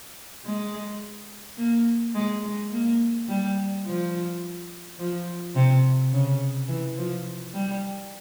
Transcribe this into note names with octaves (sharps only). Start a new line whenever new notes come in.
G#3
A#3
G#3
G#3
A#3
G3
F3
F3
C3
C#3
E3
F3
G3